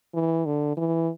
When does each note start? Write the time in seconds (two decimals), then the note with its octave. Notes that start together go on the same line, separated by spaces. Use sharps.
0.14 E3
0.46 D3
0.77 E3